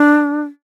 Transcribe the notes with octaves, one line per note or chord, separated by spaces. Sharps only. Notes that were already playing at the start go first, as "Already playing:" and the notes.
Already playing: D4